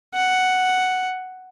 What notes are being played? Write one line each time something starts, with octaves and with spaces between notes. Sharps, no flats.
F#5